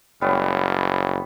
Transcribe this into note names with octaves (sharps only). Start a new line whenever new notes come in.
F#1 G3 B3 C#5